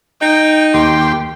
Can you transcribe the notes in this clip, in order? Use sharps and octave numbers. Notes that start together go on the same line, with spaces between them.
D#4 G5
D#2 G4 G5 C6